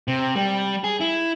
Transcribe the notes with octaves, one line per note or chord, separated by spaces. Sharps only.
C3
G3
G#4
E4